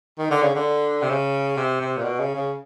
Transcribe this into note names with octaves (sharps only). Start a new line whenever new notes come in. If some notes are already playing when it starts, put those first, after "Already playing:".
D#3
D3
C#3
D3
C3
C#3
C3
C3
A#2
B2
C#3
C#3